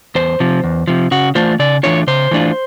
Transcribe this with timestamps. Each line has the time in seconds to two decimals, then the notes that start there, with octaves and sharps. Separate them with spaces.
0.15 E2 C5
0.40 C3 F3
0.64 E2
0.88 C3 F3
1.11 C#3 F#4
1.35 E3 A3 D4 F4 C5
1.59 C#3 D5
1.83 E3 A3 D4 F4 C#5
2.07 C#3 C5
2.31 E3 A3 D4 F4